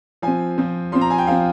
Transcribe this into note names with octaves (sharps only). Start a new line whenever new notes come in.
F3 C4 G#5
F3 C4
F3 C4 C6
A#5
G#5
G5
F3 C4 F5